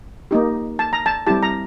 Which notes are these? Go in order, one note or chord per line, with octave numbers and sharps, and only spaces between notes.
A#3 D#4 G4
A5
A#5
A5
G3 C4 E4 G4 A5
A#5